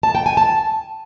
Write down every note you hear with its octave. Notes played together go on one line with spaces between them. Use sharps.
A5
G5
G#5
A5